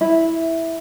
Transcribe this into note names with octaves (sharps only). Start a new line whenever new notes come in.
E4